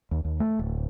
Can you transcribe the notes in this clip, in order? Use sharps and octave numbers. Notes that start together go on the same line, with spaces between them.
D#2
D#2
A3
D1